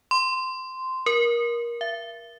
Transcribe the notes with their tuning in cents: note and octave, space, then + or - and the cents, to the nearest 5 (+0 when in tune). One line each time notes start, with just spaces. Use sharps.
C6 -10
A#4 +20
E5 +40